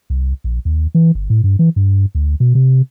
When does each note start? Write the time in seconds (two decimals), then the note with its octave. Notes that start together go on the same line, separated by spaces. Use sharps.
0.10 C2
0.44 A#1
0.65 D#2
0.95 E3
1.15 G1
1.30 A2
1.44 G2
1.59 E3
1.76 G2
2.15 D2
2.40 B2
2.55 C3